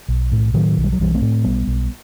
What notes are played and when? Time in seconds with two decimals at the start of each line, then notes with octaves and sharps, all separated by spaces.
0.08 B1
0.32 A2
0.54 A2 D#3 F#3
0.77 B1
0.84 G3
0.92 F#3
1.00 B1 E3 G3
1.14 A3 C4
1.21 A2
1.44 B1 G3 B3
1.67 B1